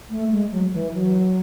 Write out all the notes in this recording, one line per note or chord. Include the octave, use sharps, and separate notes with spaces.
A3
G#3
F#3
E3
F#3